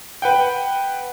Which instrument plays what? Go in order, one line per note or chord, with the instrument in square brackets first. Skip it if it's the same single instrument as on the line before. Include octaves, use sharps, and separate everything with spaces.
[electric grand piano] B4 F#5 G5